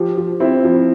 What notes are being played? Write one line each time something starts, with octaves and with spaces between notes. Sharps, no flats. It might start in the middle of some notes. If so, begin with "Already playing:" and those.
Already playing: F3 G4
F3
C4 E4
F3